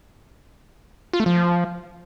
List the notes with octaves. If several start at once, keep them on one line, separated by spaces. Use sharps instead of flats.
F4
A3
F3